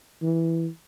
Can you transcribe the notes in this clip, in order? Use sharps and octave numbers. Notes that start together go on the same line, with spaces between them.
E3